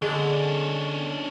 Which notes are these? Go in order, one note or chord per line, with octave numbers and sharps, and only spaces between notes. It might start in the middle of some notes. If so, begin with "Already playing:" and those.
D3 G#3 C#4 D4